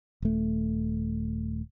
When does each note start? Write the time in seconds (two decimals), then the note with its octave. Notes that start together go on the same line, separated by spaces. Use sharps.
0.22 D#1 A3